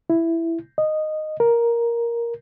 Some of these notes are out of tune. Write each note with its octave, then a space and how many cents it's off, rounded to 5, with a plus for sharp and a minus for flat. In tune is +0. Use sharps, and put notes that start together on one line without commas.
E4 +10
D#5 -10
A#4 +5